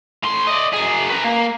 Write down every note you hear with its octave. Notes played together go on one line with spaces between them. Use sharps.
A2 C6
D5 D#5
F#2 G#4
B4 A#5
A#3